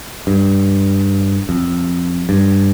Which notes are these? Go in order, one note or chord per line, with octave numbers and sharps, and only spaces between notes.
G2
F2
G2